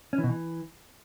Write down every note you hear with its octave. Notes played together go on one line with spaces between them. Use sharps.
C#4
E3
B2
E3